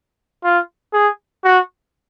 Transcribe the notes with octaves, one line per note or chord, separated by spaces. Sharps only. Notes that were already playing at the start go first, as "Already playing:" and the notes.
F4
G#4
F#4